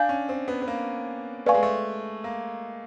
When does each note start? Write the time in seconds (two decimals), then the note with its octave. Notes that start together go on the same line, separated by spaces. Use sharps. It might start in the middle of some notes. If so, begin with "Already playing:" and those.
Already playing: D4 F5 G#5 G6
0.09 C#4
0.29 C4
0.48 B3
0.62 B3
0.68 A#3
1.46 A3 B4 D5 F5 G#5 C#6
1.54 G#3
1.63 A3
2.24 A#3